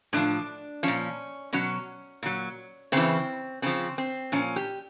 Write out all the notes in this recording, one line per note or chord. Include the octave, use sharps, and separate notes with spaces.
A2 F3 D4
A#2 F3 C#4
B2 F#3 C#4
A#2 F#3
C#3 E3 C4
C#3 F3 C4
C4
A#2 F3 C#4
G4